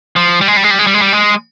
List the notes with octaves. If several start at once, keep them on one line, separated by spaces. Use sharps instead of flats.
F3
G3
G#3
G3
G#3
G3
G#3
G3
G#3
G3
G#3